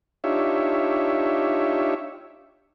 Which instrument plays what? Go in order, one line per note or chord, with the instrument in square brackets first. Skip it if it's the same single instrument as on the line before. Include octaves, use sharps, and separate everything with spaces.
[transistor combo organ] D4 D#4 F4 G4 C#5 E5